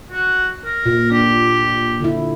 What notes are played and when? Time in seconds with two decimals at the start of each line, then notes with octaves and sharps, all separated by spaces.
0.12 F#4
0.65 A#4
0.86 A#2
1.11 D4 G4
2.00 D3 E4